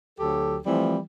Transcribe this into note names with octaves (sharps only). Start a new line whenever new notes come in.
D2 F#3 G4 A4
E3 F3 G3 A3 C4